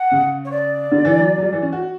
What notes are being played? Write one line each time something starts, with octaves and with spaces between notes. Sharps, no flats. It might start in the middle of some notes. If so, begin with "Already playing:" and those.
Already playing: F#5
C#3
C#5
D5
D3
E3
F#3
F#3
G3
E3
C#4
F#4